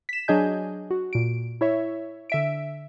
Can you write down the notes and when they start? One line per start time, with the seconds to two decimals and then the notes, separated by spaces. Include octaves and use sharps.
0.09 B6 E7
0.28 F#3 D4 G#4 D#5 G#5 G6
0.91 F#4
1.13 A#2 D7
1.61 E4 C#5 E5
2.30 D3 E5 D7